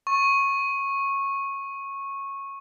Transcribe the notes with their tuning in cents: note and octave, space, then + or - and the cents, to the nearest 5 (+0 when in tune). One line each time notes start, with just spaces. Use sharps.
C#6 -15